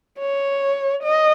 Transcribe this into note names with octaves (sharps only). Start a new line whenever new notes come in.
C#5
D#5